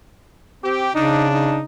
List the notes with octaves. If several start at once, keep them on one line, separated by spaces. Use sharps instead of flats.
C4 G4
C#3 D4 D#4
D#4